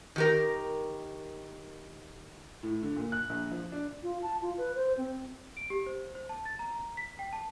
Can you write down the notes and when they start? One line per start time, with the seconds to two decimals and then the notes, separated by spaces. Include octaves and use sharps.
0.16 D#3 G4 A#4
2.63 A2
2.83 D3
2.96 A#2
3.12 F#6
3.29 A#1
3.51 F3
3.72 D4
4.03 F4
4.22 A5
4.42 F4
4.58 B4
4.75 C5
4.97 C4
5.57 D7
5.70 G4
5.86 C5
6.15 C5
6.29 A5
6.45 A6
6.59 A#5
6.75 A#5
6.97 B6
7.19 G5
7.33 A5